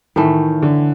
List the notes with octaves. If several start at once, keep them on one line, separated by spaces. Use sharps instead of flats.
A2 D#3 E3 A3
D3